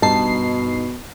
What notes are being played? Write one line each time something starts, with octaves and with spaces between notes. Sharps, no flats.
G2 B2 D#4 A5 C7